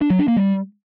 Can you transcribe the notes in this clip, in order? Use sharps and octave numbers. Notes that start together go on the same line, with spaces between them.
D4
F#3
D4
A#3
G3